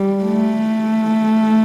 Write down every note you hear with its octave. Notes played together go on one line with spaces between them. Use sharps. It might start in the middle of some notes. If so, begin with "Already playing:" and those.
Already playing: G3
A3